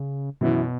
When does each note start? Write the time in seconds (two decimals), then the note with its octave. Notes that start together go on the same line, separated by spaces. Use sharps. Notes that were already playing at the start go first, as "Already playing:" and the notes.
Already playing: C#3
0.41 F#2 B2 E3 B3 E4